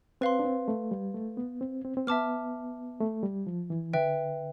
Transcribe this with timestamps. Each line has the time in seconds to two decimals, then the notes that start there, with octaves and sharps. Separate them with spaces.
0.21 C4 B4 F5 C6
0.39 D4
0.45 C4
0.68 A3
0.91 G3
1.14 A3
1.37 B3
1.61 C4
1.84 C4
1.97 C4
2.07 B3 E5 A5 D6 F6
3.00 A3
3.23 G3
3.47 F3
3.70 E3
3.93 D3 B4 E5 G5